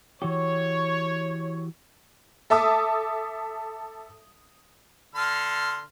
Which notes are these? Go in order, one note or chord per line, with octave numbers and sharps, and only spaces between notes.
E3 F#4 G4 C#5
A4 E5 A5 D6 D#6
D3 C6 F6